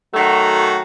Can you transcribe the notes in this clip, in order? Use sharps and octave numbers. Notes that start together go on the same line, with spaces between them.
D#3 F#3 A3 F#4